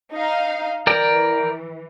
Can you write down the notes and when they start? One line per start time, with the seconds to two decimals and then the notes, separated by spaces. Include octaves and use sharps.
0.13 D#4 F5
0.87 E3 A#4 D5 G5